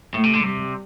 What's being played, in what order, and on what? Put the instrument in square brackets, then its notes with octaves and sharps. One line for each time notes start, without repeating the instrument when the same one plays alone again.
[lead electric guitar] A2 [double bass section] A3
[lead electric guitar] C3
D3
[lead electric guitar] C3 [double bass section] G3